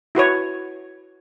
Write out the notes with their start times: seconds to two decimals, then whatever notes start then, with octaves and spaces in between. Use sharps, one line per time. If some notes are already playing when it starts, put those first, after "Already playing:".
0.15 E4 F#4 B4 C#5